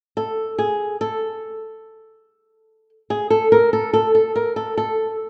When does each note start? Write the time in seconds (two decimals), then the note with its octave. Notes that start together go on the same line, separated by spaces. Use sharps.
0.17 A4
0.58 G#4
1.01 A4
3.10 G#4
3.30 A4
3.52 A#4
3.73 A4
3.93 A4
4.15 A4
4.36 A#4
4.56 A4
4.77 A4